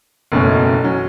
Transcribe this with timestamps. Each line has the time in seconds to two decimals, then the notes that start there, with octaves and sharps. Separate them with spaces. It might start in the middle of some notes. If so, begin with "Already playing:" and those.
0.32 F#1 E2 B2 A3 C#4
0.84 F#3 C#4